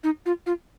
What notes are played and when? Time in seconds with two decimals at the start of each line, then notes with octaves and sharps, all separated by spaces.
0.04 D#4
0.26 F4
0.46 F4